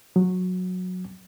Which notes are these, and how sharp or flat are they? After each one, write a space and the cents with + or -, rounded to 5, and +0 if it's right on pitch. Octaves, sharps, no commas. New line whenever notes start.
F#3 -15